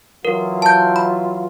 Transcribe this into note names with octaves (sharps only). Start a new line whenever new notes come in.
E3 F#3 F4 A#4
A5 G6
B5